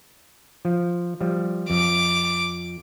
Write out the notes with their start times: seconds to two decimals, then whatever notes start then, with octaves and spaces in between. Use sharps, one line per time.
0.65 F3
1.21 F3 G3
1.70 F2 D6